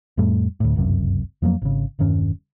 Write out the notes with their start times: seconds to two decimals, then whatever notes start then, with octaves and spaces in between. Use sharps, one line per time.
0.17 F2 A2 G3 A3
0.60 D2 A2
0.76 G1 C#2 F#2 C3
1.42 F2 F3 F#3 A#3
1.62 G#1 C#3
1.99 E1 G2 D#3 C#4